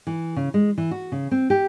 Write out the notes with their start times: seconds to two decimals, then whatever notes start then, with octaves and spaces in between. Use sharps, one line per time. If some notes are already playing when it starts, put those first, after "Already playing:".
0.07 E3
0.36 C#3
0.54 G#3
0.78 E3
0.91 F#4
1.12 C#3
1.31 C4
1.50 G4